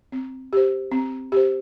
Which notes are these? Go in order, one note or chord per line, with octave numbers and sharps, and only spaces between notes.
C4
G4 C5
C4
G4 C5